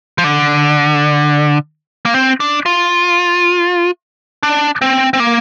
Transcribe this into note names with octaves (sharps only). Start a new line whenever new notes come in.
F3
D3
A#3
C4
D4
F4
D4
C4
C4
A#3